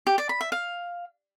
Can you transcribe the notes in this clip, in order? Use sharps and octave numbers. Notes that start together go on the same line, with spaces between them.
G4
D5
B5
E5
F5